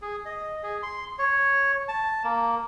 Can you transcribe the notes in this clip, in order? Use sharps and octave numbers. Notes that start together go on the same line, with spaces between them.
G#4
D#5
G#4
C6
C#5
A5
A#3